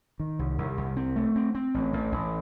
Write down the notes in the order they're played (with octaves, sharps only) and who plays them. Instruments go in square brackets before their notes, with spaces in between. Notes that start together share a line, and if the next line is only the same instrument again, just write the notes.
[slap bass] D#3
C2
C2
C2
C4
A3
C4
C4
A1
A1
A1